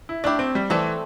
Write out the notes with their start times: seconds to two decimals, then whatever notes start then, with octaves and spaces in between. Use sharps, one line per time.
0.09 E4
0.24 A3 D4 E4 G4
0.39 C4
0.55 G3
0.70 E3 A3 C4 A4 D5